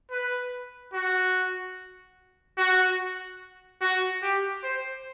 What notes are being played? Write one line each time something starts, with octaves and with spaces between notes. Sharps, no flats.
B4
F#4
F#4
F#4
G4
C5